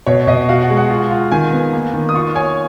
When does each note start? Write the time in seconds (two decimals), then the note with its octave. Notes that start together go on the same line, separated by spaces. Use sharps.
0.06 B2 C#5
0.27 B2 D#5
0.49 F#4 F5
0.62 F#5
0.70 G#3
0.77 F#5
0.90 F4
1.11 F4
1.32 D#3 G#5
1.53 B3
1.73 A#3
1.94 D#3
2.09 D#6
2.14 F4 C#6
2.35 C#5 G#5